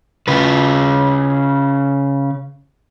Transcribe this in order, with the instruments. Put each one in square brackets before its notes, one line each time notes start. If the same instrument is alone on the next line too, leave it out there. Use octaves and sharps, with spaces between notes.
[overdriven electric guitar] C#3 B4